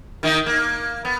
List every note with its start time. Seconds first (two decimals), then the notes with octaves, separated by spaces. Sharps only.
0.23 D#3 A#3 D#4
0.46 A#3
1.05 B3